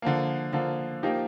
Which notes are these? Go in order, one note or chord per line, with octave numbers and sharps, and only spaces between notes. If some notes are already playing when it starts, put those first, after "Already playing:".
D3 F3 A#3
D3 F3 A#3
F3 A#3 D#4 G4